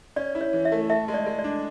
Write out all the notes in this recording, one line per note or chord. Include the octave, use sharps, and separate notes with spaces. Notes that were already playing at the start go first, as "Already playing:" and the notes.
C#4 D5
E4
C#5
E3
E5
A3
A4 E5
G#3
D5
G#3
D5
D4